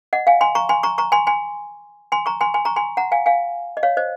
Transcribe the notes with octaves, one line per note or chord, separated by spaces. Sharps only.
D#5 F#5
F5 G#5
G#5 C6
A#5 C#6
G#5 C6
A#5 C#6
A#5 C#6
G#5 C6
G#5 C6
G#5 C6
A#5 C#6
G#5 C6
G#5 C6
A#5 C#6
G#5 C6
F#5 A#5
F5 G#5
F5 G#5
D#5
C#5 F5
C5 D#5